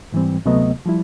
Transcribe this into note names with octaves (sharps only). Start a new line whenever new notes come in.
G#2 E3 G3 C4
D2 C3 F#3 A3 B3 D#5
F3 G3 E4